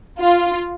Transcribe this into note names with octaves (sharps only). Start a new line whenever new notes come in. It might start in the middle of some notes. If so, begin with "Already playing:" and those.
F4